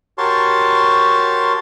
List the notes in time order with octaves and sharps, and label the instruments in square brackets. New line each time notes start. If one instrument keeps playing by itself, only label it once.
[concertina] F#4 G4 A#4 C#5 A5 C6